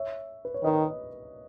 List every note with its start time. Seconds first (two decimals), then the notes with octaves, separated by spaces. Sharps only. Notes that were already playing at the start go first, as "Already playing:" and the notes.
Already playing: C#5 E5
0.45 B4
0.54 C#5
0.64 D#3 B4 D#5